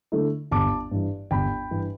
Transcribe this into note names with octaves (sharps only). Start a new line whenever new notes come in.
D3 A3 E4
G1 A5 D6
G2 E3
G1 G5 B5
G2 E3